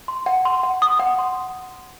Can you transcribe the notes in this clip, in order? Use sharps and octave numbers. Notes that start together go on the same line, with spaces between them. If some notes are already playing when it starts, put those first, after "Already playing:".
C6
F#5
C6
F#5
D#6
F#5
C6